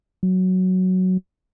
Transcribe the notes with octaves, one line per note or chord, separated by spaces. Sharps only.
F#3